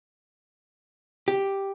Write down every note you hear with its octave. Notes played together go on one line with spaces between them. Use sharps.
G4